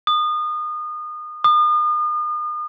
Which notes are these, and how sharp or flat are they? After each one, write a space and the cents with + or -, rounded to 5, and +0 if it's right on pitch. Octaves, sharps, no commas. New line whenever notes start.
D#6 -30
D#6 -40